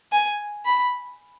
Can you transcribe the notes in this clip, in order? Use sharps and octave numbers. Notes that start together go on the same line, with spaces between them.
G#5
B5